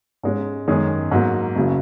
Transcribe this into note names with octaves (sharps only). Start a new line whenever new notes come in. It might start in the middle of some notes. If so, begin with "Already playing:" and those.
G#2 G#3 C#4
F#2 D#3 G#3 C#4 G#4
G#2 F#3 A#3
F#1 C#3 F#3